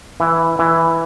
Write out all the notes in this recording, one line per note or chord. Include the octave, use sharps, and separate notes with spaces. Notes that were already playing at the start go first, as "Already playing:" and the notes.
E3
E3